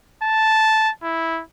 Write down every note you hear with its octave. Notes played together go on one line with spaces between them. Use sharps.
A5
E4